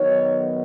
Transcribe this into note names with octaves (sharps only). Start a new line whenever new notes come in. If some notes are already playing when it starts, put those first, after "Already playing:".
Already playing: D#3 F#3 B3 D#4 C#5